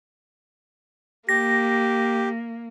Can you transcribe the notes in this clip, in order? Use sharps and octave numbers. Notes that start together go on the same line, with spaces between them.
A#3 G4 A#6